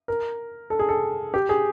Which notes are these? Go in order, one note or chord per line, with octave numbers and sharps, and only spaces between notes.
A#4
A4
G#4
A4
G4
G#4